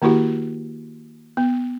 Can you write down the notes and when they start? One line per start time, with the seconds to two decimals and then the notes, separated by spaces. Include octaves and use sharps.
0.02 D#3 A#3 E4 F#4 G4
1.37 B3